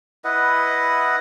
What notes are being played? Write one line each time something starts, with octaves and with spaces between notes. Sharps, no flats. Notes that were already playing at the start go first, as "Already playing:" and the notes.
E4 B4 D#5 F#5